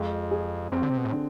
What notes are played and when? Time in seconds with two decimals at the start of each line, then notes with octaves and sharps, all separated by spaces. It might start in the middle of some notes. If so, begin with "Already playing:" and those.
Already playing: F2 G#3
0.31 G#4
0.72 F2 C4
0.83 D3
0.90 C3
0.97 B2
1.05 A2
1.12 D3